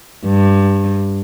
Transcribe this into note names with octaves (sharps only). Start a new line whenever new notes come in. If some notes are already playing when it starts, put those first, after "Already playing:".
G2